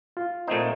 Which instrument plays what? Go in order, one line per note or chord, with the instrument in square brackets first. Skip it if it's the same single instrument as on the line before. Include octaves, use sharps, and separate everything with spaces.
[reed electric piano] F4
[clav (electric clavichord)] A#2 A3 C4 D#4 [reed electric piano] C5